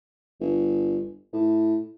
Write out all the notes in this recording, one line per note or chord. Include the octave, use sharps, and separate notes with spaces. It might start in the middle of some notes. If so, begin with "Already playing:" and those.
G1
A2